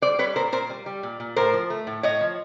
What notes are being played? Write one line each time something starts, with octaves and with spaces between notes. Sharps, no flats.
G3 C5 D5
G3 B4 C#5
A#2 A#4 C5
A#2 A#4 C5
G3
G3
A#2
A#2
A2 A#4 C5
F3
A3
A2
A2 C#5 D#5
F3